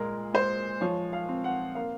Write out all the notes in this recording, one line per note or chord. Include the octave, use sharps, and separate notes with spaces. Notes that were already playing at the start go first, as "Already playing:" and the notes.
Already playing: A#2 G#3 A#4
G#3 C5
F3 C#5
F5
C4
F#5
A#3 F5